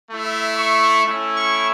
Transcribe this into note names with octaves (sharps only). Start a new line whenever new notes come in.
A3 E4
C#6
A3 C#4 E4
C#6